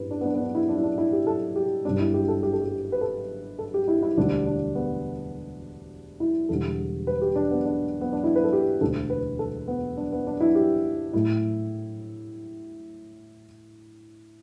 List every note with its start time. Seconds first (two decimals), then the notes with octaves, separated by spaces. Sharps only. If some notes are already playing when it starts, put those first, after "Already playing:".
Already playing: A1 G2 E3 G3 B4
0.11 D4
0.21 B3
0.25 D4
0.35 B3
0.40 D4
0.55 E4
0.69 D4
0.76 E4
0.83 D4
0.98 E4
1.13 G4
1.27 A4
1.56 G4
1.85 G1 G2 G3 D4
1.99 E4
2.14 G4
2.28 A4
2.43 G4
2.53 A4
2.62 G4
2.92 B4
3.01 A4
3.59 A4
3.74 G4
3.88 E4
4.03 E4
4.17 E1 D2 D3 G3 D4
4.46 D4
4.75 B3
6.20 E4
6.49 E1 E2 D3 G3 A4
7.07 B4
7.21 G4
7.36 D4
7.51 B3
7.65 D4
8.01 B3
8.13 D4
8.23 E4
8.36 B4
8.44 A4
8.53 G4
8.81 E1 D2 D3 A4
9.10 B4
9.39 A4
9.68 B3
9.97 D4
10.12 B3
10.27 D4
10.40 E4
10.55 G4
11.13 A2 A3 E4